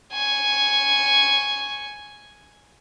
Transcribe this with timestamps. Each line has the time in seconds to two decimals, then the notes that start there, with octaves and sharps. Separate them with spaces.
0.14 G#5 C#6